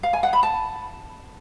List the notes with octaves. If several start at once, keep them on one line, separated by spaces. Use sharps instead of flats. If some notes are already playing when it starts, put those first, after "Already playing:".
F5
G#5
F#5
B5
A5